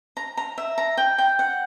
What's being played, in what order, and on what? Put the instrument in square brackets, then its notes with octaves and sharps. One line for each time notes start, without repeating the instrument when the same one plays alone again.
[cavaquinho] A#5
A#5
E5
A#5
G5
G5
F#5